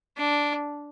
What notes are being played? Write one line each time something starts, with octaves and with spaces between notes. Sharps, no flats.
D4